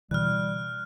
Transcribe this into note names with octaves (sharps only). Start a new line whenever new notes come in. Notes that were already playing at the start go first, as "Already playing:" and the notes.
B2 D3 E3 G3 F6 F#6